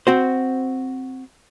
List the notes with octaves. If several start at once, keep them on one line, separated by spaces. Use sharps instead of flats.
C4 F#4 C5